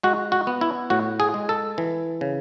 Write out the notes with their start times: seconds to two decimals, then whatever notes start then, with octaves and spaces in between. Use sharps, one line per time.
0.03 G#3 F#4
0.32 F#4
0.47 B3
0.61 E4
0.90 A2 F#4
1.20 G#4
1.34 G#3
1.49 A4
1.78 E3
2.21 C#3